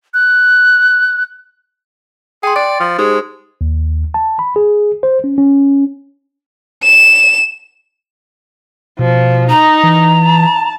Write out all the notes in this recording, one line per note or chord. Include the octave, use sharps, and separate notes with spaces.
F#6
G#4 G5 C6
D5 A6
F3
G#3 D#4 G4 C5
D#2
A5
B5
G#4
C5
C#4
C#4
E7
B2 F3
D#4 A#5
E3
A5